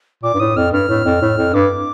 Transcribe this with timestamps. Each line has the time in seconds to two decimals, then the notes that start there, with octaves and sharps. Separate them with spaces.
0.23 A#2 D6
0.34 G2
0.39 A2 D#6
0.57 F2 F6
0.72 G2 F6
0.89 A2
1.05 F2
1.22 A2
1.38 F2
1.53 G2 D6